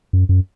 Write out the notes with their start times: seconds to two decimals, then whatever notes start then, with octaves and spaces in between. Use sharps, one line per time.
0.13 F#2
0.29 F#2